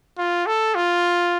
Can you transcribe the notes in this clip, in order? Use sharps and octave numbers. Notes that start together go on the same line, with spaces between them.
F4
A4
F4